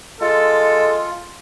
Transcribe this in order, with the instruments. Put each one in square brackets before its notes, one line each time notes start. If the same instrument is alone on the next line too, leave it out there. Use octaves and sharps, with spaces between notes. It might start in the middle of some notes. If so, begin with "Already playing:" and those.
[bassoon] G#3 [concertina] F4 [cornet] A4